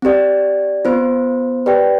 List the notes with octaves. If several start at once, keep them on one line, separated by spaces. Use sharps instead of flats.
C4 G4 D5
B3 F4 C5
G4 B4 D5 G5